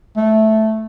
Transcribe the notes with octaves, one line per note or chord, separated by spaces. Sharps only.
A3